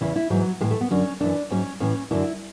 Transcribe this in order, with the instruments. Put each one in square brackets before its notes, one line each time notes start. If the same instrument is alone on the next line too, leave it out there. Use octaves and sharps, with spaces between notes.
[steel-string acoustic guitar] E2 C#3 E3 E4
E4
G#2 E3 F#3
A2 G#3
E3
A3
B3
F#2 D3 F#3 C#4
F#2 E3 D4
G#2 F#3 C#4
A2 E3 C#4
F#2 D3 F#3 E4